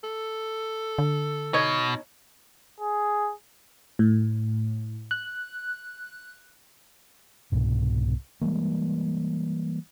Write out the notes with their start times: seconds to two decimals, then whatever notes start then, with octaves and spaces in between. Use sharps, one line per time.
0.04 A4
0.98 D3
1.54 B2 D#4 C#5 D#5
2.80 G#4
3.99 A2
5.11 F#6
7.52 C2 G#2 B2
8.41 E3 G3 G#3 A#3